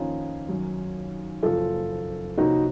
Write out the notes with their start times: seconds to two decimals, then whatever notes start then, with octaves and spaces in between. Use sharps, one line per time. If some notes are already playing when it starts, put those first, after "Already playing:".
Already playing: F2 D#3 A#3 C#4 D#4 F4
0.49 F#2 D#3 F#3
1.43 F#1 F#2 F3 A#3 F4 A4
2.37 C2 C3 F3 A#3 C#4 D#4 F#4